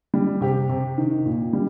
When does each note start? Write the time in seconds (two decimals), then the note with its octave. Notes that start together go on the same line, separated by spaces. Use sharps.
0.14 G3
0.41 C3 G4
0.69 C3
0.98 D#3
1.26 A#2
1.53 G3